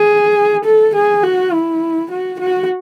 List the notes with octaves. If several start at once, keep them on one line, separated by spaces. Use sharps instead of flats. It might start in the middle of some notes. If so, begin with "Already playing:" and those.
Already playing: G#4
A4
G#4
F#4
E4
F#4
F#4